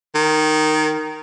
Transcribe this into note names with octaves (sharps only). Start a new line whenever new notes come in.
D#3